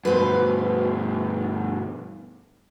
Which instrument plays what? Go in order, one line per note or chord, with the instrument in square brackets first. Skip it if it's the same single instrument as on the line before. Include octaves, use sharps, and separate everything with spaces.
[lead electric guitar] G2 B2 [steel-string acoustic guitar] B4 C5